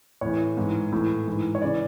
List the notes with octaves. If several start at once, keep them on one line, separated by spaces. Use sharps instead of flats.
A2 E3 C#5
G#2 E3
A2 E3
G#2 E3
C#5
C#3 E3 D5